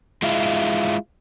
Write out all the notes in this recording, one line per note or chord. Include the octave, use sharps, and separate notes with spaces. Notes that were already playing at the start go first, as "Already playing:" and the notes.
G#3 E4 F4